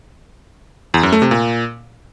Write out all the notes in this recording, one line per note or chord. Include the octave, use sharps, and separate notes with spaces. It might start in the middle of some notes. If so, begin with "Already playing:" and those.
E2
F#2
A3
C3
A#2